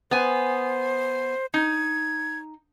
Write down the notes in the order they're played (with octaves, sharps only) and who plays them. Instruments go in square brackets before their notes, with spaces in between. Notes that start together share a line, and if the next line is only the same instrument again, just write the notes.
[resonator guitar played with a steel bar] B3 G#5 [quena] C5
[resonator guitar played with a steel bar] D#4 [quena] G#6